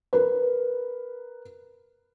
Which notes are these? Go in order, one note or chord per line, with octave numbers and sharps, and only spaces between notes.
A#4 B4